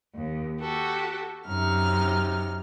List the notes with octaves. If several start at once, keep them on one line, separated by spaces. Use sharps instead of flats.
D#2
F#4 G4 A4
F#2 C3 D#4 F6